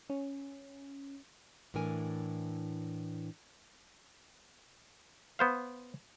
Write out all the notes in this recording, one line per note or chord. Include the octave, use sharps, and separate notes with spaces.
C#4
A2 E3 D4 A#4 G#5
B3 C5 F5